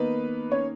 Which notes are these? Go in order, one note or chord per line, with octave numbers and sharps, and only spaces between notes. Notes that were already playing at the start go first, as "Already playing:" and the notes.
Already playing: D#3 A#3 B3 D#4 B4
C#4 C#5